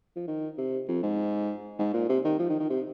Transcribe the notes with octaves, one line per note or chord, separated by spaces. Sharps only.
F3
D#3
C3
F2
G#2
G#2
A#2
C3
D#3
F3
D#3
D#3
C3